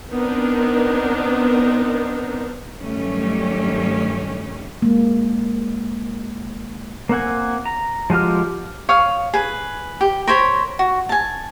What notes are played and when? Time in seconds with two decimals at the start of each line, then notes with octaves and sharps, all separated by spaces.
0.10 B3 C4 D4 D#4 A#4
2.79 G2 D#3 F#3 G3 A3 C#4
4.82 G#3 A#3
7.09 A#3 C4 F#5 G#5
7.66 A#5
8.10 F3 G#3 F#4 G4 F6
8.89 C#5 F5 D#6
9.34 G#4 B4
10.01 G4
10.27 A#4 C5 C#5 B5
10.79 F#4
11.09 G#5 A5